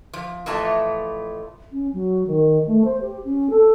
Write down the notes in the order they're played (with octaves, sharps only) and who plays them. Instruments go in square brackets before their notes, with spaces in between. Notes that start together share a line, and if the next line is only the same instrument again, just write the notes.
[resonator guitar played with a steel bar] F3
F2 A2 E3 A3 F4 A5
[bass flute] C#4
F#3
D#3
A3
C5
G4
C#4
A4